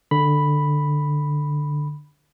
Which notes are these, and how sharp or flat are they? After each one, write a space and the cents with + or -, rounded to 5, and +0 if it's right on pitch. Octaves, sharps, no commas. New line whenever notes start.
D3 +10 B5 +0